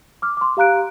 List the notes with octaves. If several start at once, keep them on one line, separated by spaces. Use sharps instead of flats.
D6 F6
C6 D6
G4 F5 A#5 F#6 D7